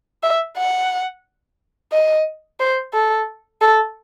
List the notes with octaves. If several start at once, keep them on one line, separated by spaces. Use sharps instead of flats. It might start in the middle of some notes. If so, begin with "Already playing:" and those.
E5
F#5
D#5
C5
A4
A4